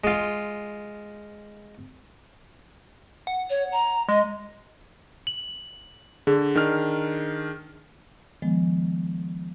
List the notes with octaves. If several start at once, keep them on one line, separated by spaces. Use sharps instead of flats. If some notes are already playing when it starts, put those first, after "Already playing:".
G#3 F4
F#5
C#5
A#5
G#3 D#5
F#7
D3 G#4
D#3 D4 F6
D#3 F3 G#3 B3